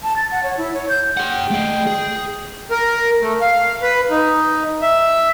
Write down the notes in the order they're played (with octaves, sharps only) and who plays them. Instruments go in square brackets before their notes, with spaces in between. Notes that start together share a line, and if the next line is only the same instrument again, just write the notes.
[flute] A5
A6
F#5
C#5
E4
C#5
G6
[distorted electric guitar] G#4 F#5 [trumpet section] G5
[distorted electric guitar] A3 G#4
G#4
[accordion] A#4
A3
F5
B4
D#4
E5